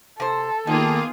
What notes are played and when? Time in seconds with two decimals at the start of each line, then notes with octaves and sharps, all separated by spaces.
0.20 C3 A4 C5
0.67 D#3 A#3 B3 D#4 F4 G#4